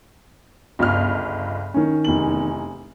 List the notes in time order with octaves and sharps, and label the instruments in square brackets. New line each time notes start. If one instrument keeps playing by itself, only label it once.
[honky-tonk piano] G1 C#2 F6
[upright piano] D#3 C#4
[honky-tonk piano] F1 E2 F#7